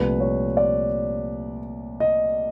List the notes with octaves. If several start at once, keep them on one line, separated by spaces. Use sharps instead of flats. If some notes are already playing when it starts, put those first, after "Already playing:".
Already playing: C2 A#2 F3 A3 B4
C#5
D5
D#5